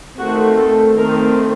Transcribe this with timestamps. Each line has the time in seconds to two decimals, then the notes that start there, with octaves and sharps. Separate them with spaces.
0.17 D#3 A3 C4 F#4
0.57 A4
0.96 D#3 A3 C4 A#4